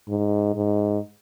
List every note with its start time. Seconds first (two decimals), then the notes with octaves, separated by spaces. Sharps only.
0.09 G#2
0.55 G#2